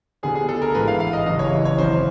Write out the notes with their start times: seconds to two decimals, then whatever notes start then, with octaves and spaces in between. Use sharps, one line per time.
0.23 D2 D3 G3 B3 G#4
0.35 G#4
0.49 A4
0.62 A#4
0.75 A1 G#2 E3 G#3 B4
0.88 F5
1.00 F5
1.13 D#5
1.26 F#1 E2 C#3 E3 G3 D#5
1.39 C#5
1.65 C#5
1.78 G#1 F#2 C#3 E3 C5